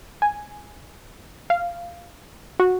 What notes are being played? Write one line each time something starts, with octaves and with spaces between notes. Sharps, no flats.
G#5
F5
F#4